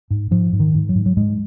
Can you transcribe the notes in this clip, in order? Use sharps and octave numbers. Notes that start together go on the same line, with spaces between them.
G#2
G#2 F3
G#2
D#3
G#2
F#3
G#2
F#3
G#2 G#3